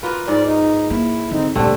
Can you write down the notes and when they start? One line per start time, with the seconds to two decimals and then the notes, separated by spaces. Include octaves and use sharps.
0.03 A#3 F4 B4
0.28 G#2 D5
0.45 D#4
0.90 A#3 E4
1.31 D3 C4 D#4
1.56 D2 A#2 D3 G3 A3 C4